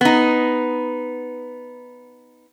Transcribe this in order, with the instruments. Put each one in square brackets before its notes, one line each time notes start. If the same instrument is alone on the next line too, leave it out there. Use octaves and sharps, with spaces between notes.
[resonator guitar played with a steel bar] B3 D#4